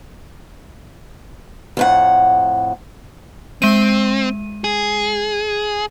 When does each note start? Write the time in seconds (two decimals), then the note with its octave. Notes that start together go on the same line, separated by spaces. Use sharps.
1.77 F2 A2 F#5
3.62 G#3 C4 D#7
4.64 G#4